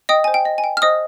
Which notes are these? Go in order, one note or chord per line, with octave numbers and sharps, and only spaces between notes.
D#5 G5 D#6
C5 G#5
G5
D#5
G#5
G5
F6
C5 D#5 D#6